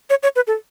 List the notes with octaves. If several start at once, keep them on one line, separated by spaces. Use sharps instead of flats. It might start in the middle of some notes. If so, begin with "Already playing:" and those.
C#5
C#5
B4
A4